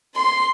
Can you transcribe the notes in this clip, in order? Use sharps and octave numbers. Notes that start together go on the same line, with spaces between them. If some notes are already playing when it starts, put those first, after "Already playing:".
C6